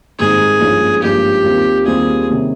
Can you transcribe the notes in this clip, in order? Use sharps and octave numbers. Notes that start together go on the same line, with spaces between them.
G#2 D#3 G3 C4 D#4 G#4
G#1 G2 F3 A#3 C#4
G#1 G2 F3 A#3 C#4 G4
D#2 D#3 G3 C4 F4
D#2 D#3 G3 C4 F4 G#4
C3 D#3 G3 C#4